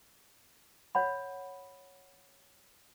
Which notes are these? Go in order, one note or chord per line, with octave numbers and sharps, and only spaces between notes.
C#5 F#5 B5